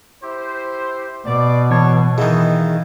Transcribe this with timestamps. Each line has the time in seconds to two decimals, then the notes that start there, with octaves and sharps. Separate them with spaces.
0.23 E4 G4 C5
1.26 B2 D5
1.71 E3 B3 C#5 A5 G#6
2.18 D#3 E3 G#4 D#5 F5